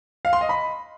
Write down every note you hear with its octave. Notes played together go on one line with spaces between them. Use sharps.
F5
C6
D#5
B5